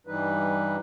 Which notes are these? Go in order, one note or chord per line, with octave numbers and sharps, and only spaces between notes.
G2 E3 G3 D#4 B4